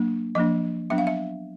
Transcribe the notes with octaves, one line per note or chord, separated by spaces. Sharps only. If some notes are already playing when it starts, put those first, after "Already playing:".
Already playing: F#3 A#3 D4
F3 A#3 D4 D#5
F#3 B3 D4 E5
F5
E5